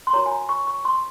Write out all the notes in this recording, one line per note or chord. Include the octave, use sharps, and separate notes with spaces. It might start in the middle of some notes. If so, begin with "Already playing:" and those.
C6
F#4 A#4 C#5 A#5
G#5
A#5
C#6
C#6
C6